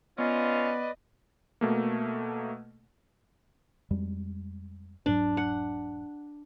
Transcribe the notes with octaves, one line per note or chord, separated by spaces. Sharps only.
B3 C#4 F4 B4 D5 D#5
B2 A3 A#3
F2 G3 G#3
E1 G#2 F#3 D4
F#5